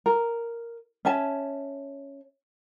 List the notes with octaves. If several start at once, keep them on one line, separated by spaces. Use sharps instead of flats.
A#4
C#4 E5 G#5 A5